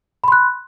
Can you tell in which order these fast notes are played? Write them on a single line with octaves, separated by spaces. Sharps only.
B5 C6 F#6